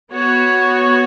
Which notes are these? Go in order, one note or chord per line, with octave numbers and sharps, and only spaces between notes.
B3 F#4 C#5